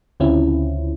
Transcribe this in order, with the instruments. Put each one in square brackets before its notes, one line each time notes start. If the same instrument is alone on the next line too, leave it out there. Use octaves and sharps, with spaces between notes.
[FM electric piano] D2 C#3 C4 C#4 E4 F4